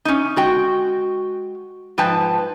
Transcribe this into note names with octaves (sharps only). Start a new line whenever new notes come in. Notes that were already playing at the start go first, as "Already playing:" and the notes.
C#4 D#4
G#3 F#4 G5
G#2 F3 B4 G5 A5